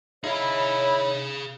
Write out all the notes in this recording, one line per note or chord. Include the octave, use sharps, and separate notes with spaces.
D#4 E4 G#4 C#5 F5